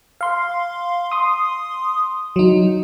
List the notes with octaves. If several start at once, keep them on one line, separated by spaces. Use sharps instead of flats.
F5 C6
C6 D#6
F#3 D#4